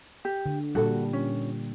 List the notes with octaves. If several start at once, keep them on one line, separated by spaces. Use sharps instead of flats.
G4
D3
A#2 G3 F#4 A4
C#4